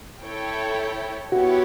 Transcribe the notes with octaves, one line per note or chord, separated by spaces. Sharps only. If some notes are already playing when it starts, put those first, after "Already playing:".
E4 A4 C#5 G5
B3 E4 F#4 G4 C#5